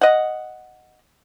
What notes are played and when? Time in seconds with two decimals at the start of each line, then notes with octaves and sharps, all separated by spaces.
0.01 D#5 F#5